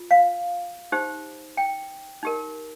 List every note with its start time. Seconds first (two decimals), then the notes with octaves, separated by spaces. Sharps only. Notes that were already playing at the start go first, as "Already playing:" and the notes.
Already playing: F4
0.11 F5
0.92 D#4 G4 C5
1.57 G5
2.23 D#4 G4 A#4